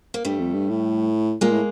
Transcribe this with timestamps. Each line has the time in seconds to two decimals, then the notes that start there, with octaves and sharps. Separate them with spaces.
0.14 A#3
0.25 G2 G3 A3
0.39 F2
0.54 G2
0.69 A2
1.41 A#2 G#3 A#3
1.52 A2